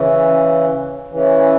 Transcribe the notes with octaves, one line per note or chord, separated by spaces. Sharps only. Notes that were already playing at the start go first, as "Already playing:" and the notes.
Already playing: C#3 E3
C#3 E3